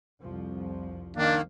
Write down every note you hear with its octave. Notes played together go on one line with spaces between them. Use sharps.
C2 F2 F3
D#3 A#3 D4 F5